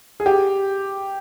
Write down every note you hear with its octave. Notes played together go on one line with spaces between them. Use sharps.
G#4
G4